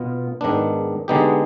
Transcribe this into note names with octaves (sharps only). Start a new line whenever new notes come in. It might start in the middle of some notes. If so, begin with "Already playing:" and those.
Already playing: B2 B3 F4
G#2 D#3 B3 D4
D3 G#3 B3 D#4 G4